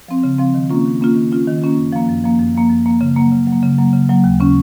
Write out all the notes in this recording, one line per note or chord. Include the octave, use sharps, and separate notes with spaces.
F3 C4
C#3
F3 C4
D#3
A#3 C#4 F4
D#3
A#3 C#4 F4
D#3
A#3 C#4 F4
D#3
A#3 C#4 F4
F#2
F3 A#3
F#2
F3 A#3
F#2
F3 A#3
F#2
F3 A#3
C#3
F#3 A#3
C#3
F#3 A#3
C#3
F#3 A#3
C#3
F#3 A#3
D#2
C#3 G#3 C#4